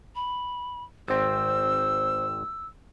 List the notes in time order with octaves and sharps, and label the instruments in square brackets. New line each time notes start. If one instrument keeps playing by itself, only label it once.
[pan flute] B5
[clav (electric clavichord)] G#1 C4 [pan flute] C5 [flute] E6